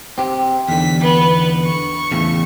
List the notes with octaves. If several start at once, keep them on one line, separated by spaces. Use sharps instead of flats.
C4 G4
E2 D3 B6
B3 B4
C#6
E2 A2 C#3